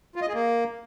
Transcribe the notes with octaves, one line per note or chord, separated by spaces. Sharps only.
F4
D#5
G#4
A#3